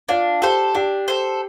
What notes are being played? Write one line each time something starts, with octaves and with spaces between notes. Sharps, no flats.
D4 F4
G4 A4 C5
D4 G4
A4 C5